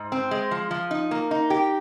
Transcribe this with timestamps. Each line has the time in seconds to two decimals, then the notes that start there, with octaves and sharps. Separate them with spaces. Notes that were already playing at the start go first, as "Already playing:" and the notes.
Already playing: G#2
0.12 C4
0.31 G#3
0.51 F3
0.71 F3
0.91 D#4
1.11 A#3
1.31 D#4
1.50 G4